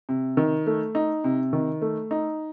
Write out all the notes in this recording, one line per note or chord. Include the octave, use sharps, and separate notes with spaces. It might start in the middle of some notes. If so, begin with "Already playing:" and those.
C3
D#3
A3
D#4
C3
D#3
A3
D#4